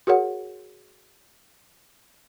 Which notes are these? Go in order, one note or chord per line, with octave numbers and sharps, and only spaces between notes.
F#4 G#4 A#4 C#5 F#5